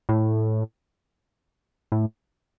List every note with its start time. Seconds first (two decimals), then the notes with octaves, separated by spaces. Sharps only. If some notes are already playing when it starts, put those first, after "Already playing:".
0.09 A2
1.92 A2